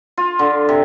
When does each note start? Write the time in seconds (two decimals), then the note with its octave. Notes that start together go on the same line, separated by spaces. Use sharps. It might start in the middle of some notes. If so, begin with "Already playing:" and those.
0.17 F4
0.39 D3
0.69 C3